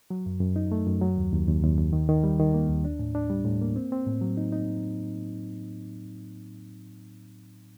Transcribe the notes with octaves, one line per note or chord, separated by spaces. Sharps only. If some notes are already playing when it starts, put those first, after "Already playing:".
F#3
F#2
F#2
D#4
A3
F#2
F#3
D#2
D#2
D#2
D#2
D#2
D#3
D#3
G3
D#3
A#3
D#2
D4
A2
D4
G3
A2
A#3
C4
C4
A2
F#3
D#4
D#4